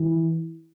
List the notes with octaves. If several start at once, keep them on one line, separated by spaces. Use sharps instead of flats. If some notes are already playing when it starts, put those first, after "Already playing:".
Already playing: E3